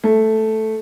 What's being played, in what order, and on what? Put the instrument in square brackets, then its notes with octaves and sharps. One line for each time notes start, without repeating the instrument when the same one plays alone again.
[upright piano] A3